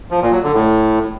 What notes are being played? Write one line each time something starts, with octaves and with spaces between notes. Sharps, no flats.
F3
A#2
F#3
D3
A2